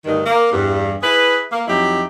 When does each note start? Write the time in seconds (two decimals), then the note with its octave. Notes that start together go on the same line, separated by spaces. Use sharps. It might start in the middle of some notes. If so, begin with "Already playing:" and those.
0.05 D2 G2 D#3
0.26 A#3
0.52 E2 G2
1.02 E4 G#4 B4
1.52 A#3
1.67 F2 F#3 D#4 E4 G4